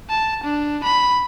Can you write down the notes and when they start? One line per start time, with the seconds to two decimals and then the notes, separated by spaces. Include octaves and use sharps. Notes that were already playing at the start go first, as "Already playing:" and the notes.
0.10 A5
0.44 D4
0.84 B5